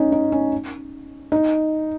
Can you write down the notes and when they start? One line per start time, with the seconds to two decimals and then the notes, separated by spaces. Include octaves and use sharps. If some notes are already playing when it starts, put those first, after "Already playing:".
Already playing: C#4 D#4
0.12 D#4
0.32 C#4
1.32 D#4